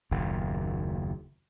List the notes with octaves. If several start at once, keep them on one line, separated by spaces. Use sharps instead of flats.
F#1 D#2 A#2